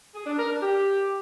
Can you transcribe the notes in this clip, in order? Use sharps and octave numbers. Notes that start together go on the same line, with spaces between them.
G#4
D4
A#4
D4
G4